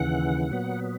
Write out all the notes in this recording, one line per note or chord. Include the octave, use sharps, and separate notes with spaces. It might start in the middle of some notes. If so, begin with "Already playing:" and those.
Already playing: D#2 C#3 E3 F#5
A#2 F#3 B3